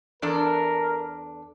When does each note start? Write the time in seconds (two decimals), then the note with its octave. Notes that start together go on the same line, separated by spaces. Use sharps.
0.22 E2 D4 A4 A#4